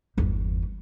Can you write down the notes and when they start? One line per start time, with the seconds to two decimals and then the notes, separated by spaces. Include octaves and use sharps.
0.17 G1 E2